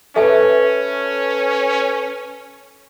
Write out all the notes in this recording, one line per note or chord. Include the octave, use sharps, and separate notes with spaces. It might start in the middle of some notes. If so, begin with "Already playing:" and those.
C#4 A4 B4 E5 G#5